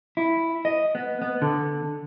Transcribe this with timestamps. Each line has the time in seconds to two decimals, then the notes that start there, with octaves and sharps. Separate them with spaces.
0.17 E4
0.65 D#5
0.95 B3
1.22 B3
1.42 D3